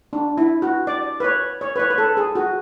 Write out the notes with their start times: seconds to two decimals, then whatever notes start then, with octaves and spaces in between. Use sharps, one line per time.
0.13 D4
0.37 E4
0.62 F#4
0.87 D5
1.20 B4
1.24 C#5
1.61 C#5
1.76 B4
1.80 C#5
1.90 B4
1.98 A4
2.17 G#4
2.35 F#4